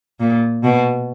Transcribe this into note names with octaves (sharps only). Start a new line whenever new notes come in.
A#2
B2